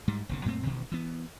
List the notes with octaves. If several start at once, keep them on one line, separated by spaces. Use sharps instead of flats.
G#2 G3
F#1 B1 C#3
F#2 A#2 A3 C4
A1 B2 D#3
E3 B3